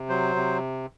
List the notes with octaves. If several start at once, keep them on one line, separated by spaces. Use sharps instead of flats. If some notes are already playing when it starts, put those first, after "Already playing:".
Already playing: C3
F#3 C5
C3